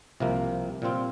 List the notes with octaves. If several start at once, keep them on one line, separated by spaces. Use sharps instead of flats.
C2 C3 F3 A#3
A#2 G3 C4 F4